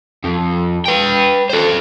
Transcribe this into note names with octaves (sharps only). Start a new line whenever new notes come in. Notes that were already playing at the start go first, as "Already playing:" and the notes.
F2
B4 G5
A4 C5